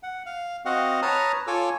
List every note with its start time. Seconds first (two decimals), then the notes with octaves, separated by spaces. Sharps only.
0.03 F#5
0.26 F5
0.65 C4 F#4 D#5 F5 F#5
1.02 B4 C#5 A5 A#5 D#6 F6
1.47 F4 A4 C#5 G#5 D6 E6